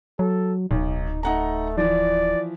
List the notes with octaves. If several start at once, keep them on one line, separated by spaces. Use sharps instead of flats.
F#3 A4
D1 B1 D#4
A3 D#4 F#5 A#5
E3 F3 D5